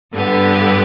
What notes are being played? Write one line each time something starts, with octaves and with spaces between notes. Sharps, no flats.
G2 D3 B3 G4